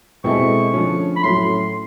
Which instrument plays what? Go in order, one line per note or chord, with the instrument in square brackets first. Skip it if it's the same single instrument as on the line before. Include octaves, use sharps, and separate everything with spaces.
[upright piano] B2 G#3 C4 E4 A4 [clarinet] C#6
[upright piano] D3 F3 A3 C#4
[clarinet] B5
[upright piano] A2 F#3 A3 C#4 E4 [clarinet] C6